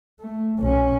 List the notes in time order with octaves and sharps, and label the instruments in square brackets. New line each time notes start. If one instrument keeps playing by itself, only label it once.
[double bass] A3
B1 C#4